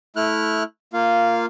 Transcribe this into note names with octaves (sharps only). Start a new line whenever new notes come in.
A3 E4 F6 F#6
A#3 F4 F5